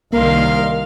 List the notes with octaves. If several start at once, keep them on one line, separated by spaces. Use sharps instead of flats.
C2 D#3 A#3 A#4 F5 C6